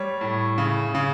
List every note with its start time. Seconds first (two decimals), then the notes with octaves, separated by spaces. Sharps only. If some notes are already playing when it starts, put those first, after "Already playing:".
Already playing: G3 C#5
0.21 A2
0.58 C#3
0.95 C#3